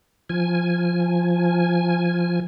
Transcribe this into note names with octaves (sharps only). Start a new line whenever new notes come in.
F3 G#5